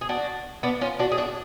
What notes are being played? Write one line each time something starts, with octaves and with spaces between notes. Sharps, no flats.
G#4
D4 F#4
B3 D4
C#4 F4
D4 F#4
G#4
D4 F#4